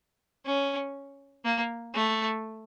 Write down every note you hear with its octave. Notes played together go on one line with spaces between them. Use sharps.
C#4
A#3
A3